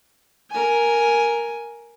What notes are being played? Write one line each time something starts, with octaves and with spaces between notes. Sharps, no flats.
A#4 G#5